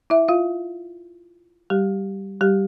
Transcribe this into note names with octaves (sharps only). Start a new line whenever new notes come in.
E4 E5
F4 F5
G3 G4
G3 G4